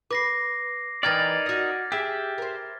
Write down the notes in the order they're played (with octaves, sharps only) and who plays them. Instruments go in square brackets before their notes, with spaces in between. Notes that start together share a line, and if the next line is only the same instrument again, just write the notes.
[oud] B4 [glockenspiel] D6 A#6 C7
[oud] E3 G4 [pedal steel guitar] D#4 A#4 D5 [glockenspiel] F6 G#6 A6
[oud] F#4 D#5
[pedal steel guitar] G4 E5 [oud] G#4
[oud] A#4 C5